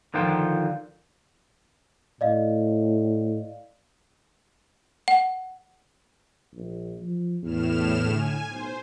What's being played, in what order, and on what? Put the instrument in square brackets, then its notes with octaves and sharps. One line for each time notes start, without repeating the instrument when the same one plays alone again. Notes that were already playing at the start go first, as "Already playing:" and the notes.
[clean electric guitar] D3 D#3 F3 F4 G5
[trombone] A2 [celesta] D5 D#5 F5
[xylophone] F#5
[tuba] A#1
F3
[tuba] E2 [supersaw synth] A2 F6 E7
[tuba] D3 [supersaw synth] G#5
[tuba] B1 [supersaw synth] C5